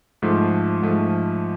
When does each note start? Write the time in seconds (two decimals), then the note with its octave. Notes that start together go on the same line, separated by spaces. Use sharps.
0.22 G#2 F3 A3
0.82 G#2 F3 A3